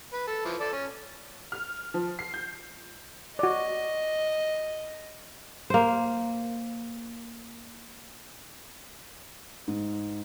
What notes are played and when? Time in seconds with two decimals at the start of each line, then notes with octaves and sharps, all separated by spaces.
0.13 B4
0.27 A4
0.45 E3 F3
0.60 A4 D5
0.73 C#4
1.52 F6
1.94 F3
2.19 C7
2.34 G6
3.39 F#4 D5 D#5
5.70 A#3 C5
9.68 G#2